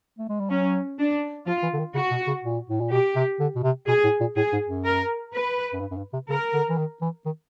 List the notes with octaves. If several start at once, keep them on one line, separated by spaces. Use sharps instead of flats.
A3
G#3
G3
F#3 C#4
D4
F3 F4
E3
D3
D#3
C#3 F#4
B2
C#3
A#2
A2
A#2
B2 G4
C3
D3
B2
C3
B2 G#4
A2
A#2
A2 G#4
G#2
F#2
A#4
B4
F#2
G2
F#2
G2
C3
C#3 A#4
D3
E3
D#3
E3
D#3